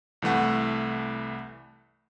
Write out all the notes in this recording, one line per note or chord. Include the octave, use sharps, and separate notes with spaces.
C2 E3 A3 F#5